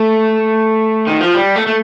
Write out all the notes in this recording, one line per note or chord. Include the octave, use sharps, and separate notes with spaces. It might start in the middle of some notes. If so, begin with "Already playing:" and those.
Already playing: A3
D#3
F3
G3
A3
A3